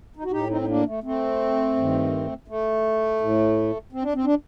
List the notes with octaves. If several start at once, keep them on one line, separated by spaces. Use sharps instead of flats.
D#4
F#4
A2 D#4 G4
C4 D#4
D#4
A#3 D4
A3
A3 C4
G2 D#3
A3
A2
C4
D4
C4
D4